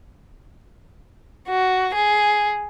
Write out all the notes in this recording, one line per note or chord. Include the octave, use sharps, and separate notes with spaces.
F#4
G#4